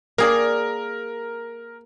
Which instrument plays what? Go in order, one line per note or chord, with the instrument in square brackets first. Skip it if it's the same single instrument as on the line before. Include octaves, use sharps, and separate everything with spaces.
[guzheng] A#3 G#4 D5 [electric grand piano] A#4